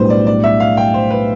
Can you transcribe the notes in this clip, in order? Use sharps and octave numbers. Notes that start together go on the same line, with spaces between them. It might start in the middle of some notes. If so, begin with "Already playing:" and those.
Already playing: B1 A2 G3 D4 B4 C5
D5
D5
E5
F5
G5
C5
B4